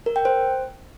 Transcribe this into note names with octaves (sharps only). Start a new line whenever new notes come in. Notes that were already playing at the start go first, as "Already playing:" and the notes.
A#4
G5
C5